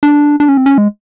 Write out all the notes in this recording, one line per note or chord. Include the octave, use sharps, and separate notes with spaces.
D4
D4
C#4
C4
C#4
G#3